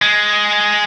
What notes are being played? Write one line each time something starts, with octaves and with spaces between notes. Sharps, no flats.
G#3